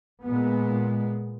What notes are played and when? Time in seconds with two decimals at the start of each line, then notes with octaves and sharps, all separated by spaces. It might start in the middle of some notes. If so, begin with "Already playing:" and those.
0.24 A#2 G#3 B3